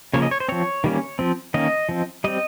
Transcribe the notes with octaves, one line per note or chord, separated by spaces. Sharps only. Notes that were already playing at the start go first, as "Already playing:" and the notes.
C#3 F3 A#3 C#4 C#5
D#5
C#5
C5
F3 C4 C#5
D#3 G3 A#3 C#4
F3 C4
D#3 A#3 C#4 D#5
F3 C4
G3 C4 D#5